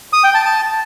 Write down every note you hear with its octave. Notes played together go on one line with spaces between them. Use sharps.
D#6
G5
A5
A5